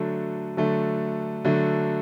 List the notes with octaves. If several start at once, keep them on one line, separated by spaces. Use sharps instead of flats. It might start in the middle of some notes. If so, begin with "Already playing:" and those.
Already playing: D3 F#3 A3
D3 F#3 A3
D3 F#3 A3